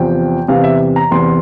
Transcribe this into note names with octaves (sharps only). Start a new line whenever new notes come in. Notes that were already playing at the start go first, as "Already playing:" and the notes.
Already playing: E2 C3 F3 G5
E2 C3 E3 F5
E5
A#5
E2 C3 E3 C6